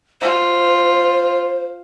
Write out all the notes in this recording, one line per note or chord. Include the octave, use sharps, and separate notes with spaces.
F4 C5